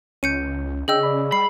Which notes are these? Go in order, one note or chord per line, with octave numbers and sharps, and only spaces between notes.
C#2 C#4 G6 C#7 D#7
C#3 D4 G#4 D#5 G5 E6
D5 B5
G3 B5 C7